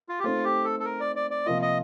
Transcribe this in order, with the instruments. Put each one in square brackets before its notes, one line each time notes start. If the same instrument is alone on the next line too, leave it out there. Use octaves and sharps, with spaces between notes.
[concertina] F4
G4
[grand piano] A3 C4 D#4 [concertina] F4
[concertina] G4
A4
A4
A#4
D5
D5
D5
[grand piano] C3 F3 A#3 F4 [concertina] D#5
[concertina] D#5